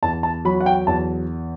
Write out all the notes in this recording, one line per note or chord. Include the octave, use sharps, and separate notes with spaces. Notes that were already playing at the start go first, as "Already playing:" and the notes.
E2 A5
A5
F#3 B5
F#5
G5
E2 A5